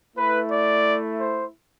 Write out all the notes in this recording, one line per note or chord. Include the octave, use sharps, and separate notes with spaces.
A3 E4 B4
D5
C5